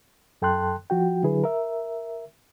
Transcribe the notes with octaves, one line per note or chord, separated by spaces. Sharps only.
F#2 A4 G5 A5 C6 F#6
F3 F#4 G5
D3 F#3 E4 G#4 B4
A#4 E5